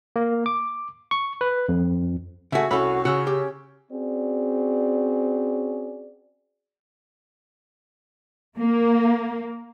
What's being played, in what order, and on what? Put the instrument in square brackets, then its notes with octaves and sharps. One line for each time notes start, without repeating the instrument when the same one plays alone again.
[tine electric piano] A#3
D6
C#6
B4
F2
[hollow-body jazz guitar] C#3 F#4 [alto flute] A3 [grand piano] E5 G#5
[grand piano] C2 C#4 E6 [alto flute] F#4 [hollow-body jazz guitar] A4 B5
[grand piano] C#3 E6 [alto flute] C#4 [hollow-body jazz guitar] F#4
[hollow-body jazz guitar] G4
[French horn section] C4 C#4 F#4 G#4 D5
[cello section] A#3